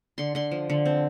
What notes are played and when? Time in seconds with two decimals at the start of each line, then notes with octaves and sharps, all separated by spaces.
0.18 D3 C6
0.35 D3 C6
0.52 F3
0.70 D3
0.85 C4